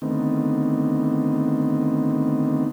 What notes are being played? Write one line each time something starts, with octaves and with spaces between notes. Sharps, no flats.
D3 D#3 A3 B3 C4 D#4